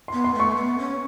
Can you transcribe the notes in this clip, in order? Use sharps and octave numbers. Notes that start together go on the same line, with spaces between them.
B3 C6
C6
A3 C#6
B3
C#4